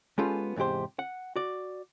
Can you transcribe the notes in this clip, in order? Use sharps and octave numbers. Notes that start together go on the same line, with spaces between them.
G#3 B3 C#4 F4 G4 A4
E2 G#2 C3 G4 C5
F#5
F#4 D5